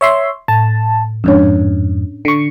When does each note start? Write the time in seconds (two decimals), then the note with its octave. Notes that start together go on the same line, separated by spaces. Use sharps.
0.01 C#5 E5 C6
0.48 A2 A5
1.24 F2 G#2 C#4 D4 C#5
2.25 D3 C#6